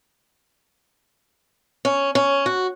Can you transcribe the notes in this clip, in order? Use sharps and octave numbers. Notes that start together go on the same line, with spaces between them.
C#4
C#4
F#4